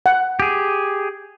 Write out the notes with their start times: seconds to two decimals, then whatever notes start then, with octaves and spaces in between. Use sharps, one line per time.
0.06 F#5
0.40 G4 G#4